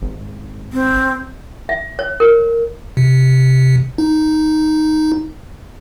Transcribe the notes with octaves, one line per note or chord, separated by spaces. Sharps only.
G#1
C4
E5
C#5
A#4
C3
D#4